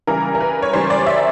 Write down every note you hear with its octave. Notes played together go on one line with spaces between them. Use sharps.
C#3 E3 G3 A#4
A#4
B4
C#5
C#3 E3 G3 C5
D5
E5